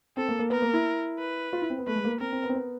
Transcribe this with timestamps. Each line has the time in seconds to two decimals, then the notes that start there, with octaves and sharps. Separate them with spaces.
0.17 C4 A4
0.28 A#3
0.39 A#3
0.50 B3 A#4
0.62 A#3
0.73 E4
1.19 B4
1.53 F4
1.62 E4
1.70 C4
1.78 B3
1.87 A3 B4
1.95 G#3
2.05 A#3
2.20 C4 A#4
2.32 C4
2.43 B3
2.50 C4
2.55 B3